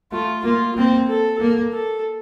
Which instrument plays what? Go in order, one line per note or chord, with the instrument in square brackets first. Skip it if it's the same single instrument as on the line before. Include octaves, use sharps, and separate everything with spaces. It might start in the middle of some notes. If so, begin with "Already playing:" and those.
[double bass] A3 [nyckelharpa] F4
[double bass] A#3 [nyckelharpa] F4
[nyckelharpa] A#3 [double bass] C4
[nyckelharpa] A4
[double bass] A#3
[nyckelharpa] A4